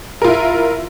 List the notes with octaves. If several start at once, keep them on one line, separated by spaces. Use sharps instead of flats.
E4 F4 A#4